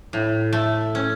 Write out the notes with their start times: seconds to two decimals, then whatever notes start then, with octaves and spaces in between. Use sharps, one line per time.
0.13 A2
0.53 A3
0.95 C#4